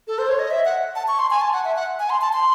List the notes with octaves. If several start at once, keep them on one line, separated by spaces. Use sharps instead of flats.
A4
C5
C#5
D#5
E5
F#5
A5
C#6
C6
G#5
A5
F#5
E5
F#5
G#5
C6
A5
C6